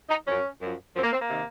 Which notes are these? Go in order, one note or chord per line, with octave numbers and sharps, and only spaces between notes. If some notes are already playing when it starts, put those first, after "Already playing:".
D#4
F#2 F3 C#4
F#2 F3
F#2 F3 C4
A#3
C4
A#3
C3 D#3